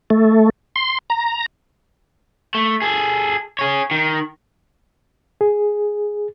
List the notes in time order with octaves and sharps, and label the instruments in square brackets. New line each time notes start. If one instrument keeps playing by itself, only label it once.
[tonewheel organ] A3
C6
A#5
[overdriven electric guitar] A3
G#4 A4
G#4 C#5
D#3
[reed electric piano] G#4